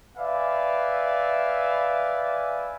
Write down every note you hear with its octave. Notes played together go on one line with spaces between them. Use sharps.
B4 D5 E5 F5 G#5